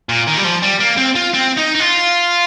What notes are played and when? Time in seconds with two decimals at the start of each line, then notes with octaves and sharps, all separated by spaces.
0.09 A#2
0.27 D#3
0.37 G3
0.44 F3
0.62 G3
0.80 A#3
0.97 C4
1.16 F4
1.34 C4
1.58 D#4
1.75 D#4
1.80 F4